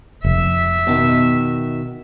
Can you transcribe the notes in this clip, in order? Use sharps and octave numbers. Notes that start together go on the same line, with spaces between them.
F1 E5
B2 D#3